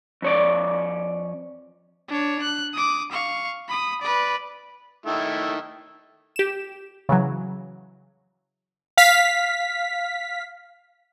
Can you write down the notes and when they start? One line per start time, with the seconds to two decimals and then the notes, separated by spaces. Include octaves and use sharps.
0.22 F2 C#5 D5
2.08 D4 C#5
2.42 F#6
2.74 D6 D#6
3.12 F5 C#6
3.68 B5 D#6
4.02 B4 D5
5.06 D#3 A3 E4
6.36 G4 E7
7.09 C#3 E3 F#3
8.97 F5 B6